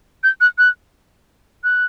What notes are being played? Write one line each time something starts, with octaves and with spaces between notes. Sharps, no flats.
G6
F#6
F#6
F#6